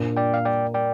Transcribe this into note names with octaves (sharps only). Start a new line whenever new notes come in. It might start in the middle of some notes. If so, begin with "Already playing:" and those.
Already playing: A#2 A#3 D4
D5 G5
F5
D5 G5
D5 G5